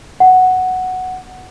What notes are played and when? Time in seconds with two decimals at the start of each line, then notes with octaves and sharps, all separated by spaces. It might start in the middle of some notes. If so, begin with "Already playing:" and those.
0.20 F#5